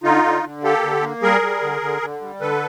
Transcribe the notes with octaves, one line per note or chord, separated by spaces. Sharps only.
D3 D#4 F4
D3
D3
A#3 G4 A4
D3
A#3
G3 G#4 A#4
G3
D3
D3
D3
G3
D3 A4 B4